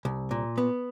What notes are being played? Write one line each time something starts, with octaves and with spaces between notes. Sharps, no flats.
C2
A#2
B3